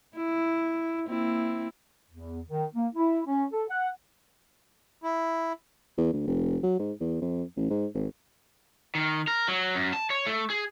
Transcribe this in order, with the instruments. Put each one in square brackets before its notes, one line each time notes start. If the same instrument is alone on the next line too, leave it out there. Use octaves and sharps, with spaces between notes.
[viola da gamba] E4
A#3 C4 E4
[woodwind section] E2
D#3
A#3
E4
C#4
A4
F#5
[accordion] E4
[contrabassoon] E2
D2
F1
F#3
G#2
E2
F2
A1
G#2
G#1
[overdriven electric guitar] D#3
A#4
F#3
F#2
A5
C#5
A3
G#4